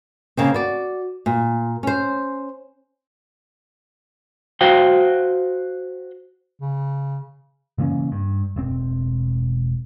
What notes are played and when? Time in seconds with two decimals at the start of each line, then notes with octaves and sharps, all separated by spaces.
0.37 C#3 A#3 C4
0.54 F#4 D5
1.26 A#2
1.83 C#4 C5
4.61 F#4 C5 F5 G5
6.61 C#3
7.78 C#3 E3 A#3 C#4
8.12 G2
8.56 E1 C4